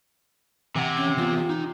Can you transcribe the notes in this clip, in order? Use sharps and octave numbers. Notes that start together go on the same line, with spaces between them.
C3 E3 F#5
C#4
E3 B3 F4
D#4